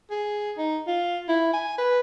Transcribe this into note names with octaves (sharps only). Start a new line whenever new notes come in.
G#4
D#4
F4
E4
G#5
B4